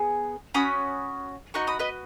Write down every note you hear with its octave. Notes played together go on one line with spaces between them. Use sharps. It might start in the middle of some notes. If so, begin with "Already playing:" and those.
Already playing: B3 G#4
C#4 F#4 B5 D#6
B3 D#4 F#4 C#6 F#6
B5 D#6
B4 D#5